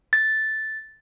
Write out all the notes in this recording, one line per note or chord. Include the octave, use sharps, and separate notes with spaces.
A6